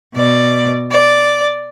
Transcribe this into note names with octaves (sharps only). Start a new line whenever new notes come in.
B2 D5
D5